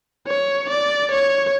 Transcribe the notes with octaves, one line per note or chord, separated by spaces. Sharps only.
C#5
D5
C#5